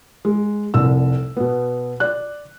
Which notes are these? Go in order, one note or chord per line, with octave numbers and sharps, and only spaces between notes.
G#3
F1 C2 E6
B2 B3
D5 F#6